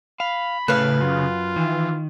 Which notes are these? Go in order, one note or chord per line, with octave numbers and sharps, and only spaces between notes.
F5 B5
A2 C#3 A3 B4 F5
F#2 F4
D#3 E3